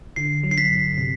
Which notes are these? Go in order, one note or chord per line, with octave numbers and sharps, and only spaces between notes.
D3 C7
F#3
C7
B6
G2
C3